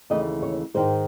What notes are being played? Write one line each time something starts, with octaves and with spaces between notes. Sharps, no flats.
D#2 C#3 E3 A3 D#5
C#5
G#2 D#3 G#3 C5